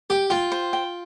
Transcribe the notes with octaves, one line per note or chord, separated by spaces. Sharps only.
G4 G5
F4 G5
C5
G5